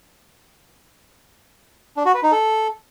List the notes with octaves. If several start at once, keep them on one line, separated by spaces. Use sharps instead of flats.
D4
F#4
B4
D#4
A4